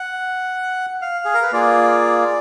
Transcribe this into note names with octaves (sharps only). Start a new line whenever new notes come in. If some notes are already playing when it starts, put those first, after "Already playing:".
Already playing: F#5
F5
G#4
A#4
B4
A#3 F4 G#4 D5